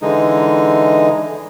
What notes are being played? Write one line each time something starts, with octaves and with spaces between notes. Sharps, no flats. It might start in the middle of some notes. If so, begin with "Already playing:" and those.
D3 E3 G#3 D#4